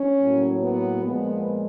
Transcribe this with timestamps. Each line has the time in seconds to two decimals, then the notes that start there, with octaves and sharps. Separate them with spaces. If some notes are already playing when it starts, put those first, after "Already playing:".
Already playing: C#4
0.19 A2 F#3 A#3
0.61 B3
1.03 A#2 F3 G#3 B3